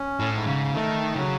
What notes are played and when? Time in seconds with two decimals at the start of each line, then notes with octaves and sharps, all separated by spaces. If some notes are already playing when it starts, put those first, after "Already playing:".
Already playing: C#4
0.19 A2
0.33 G#2
0.47 C#3
0.74 D#3 A3
1.16 C#3 F#3